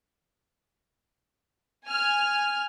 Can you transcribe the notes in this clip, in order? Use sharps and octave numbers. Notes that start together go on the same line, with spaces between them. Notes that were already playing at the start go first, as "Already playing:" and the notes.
G#5 F6